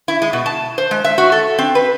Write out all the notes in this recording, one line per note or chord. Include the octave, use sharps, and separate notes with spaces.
E4
G#3
B2
A5
C5
G#3
E5
F#4
A4
C4
B4